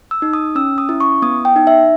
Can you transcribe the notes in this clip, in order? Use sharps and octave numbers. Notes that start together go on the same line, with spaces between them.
E6
D#4
D#6
C#4 E6
D#6
E4
C#6
B3 D#6
G5
D#4
E5